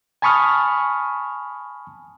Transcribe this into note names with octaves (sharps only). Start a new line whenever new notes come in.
G#5 A5 B5 C#6 D#6 F6